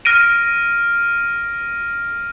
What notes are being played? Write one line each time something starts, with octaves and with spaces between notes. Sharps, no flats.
F6 A#6 D7 D#7